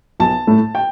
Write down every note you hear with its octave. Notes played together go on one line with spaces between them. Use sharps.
B1 A5
A2 A3
G5